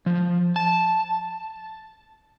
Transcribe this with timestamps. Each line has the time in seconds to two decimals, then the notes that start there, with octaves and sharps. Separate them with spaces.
0.06 F3
0.56 A5